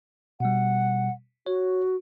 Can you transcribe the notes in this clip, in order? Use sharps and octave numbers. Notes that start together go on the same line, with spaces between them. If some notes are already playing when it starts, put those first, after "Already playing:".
B2 G3 F#5
F#4 C#5